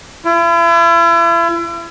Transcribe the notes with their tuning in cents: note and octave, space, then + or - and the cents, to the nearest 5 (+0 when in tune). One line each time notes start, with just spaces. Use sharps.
E4 +40